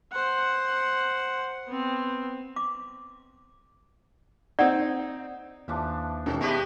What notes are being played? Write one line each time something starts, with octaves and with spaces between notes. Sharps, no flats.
C5 F#5
B3 C4
D6
C4 D#4 D5 F#5
D#2 E3 F3 D4 E5 D6
E1 D#3 C#4
G#3 B3 G4 B4 E5 A5 C#6